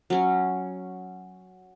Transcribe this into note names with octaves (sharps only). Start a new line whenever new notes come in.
F#3 C#4